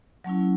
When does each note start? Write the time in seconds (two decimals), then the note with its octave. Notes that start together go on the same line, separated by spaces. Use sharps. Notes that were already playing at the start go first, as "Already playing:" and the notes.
0.24 F#3 A3 C#4 E4